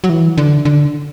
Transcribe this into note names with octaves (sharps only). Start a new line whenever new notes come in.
F#3
E3
D3
D3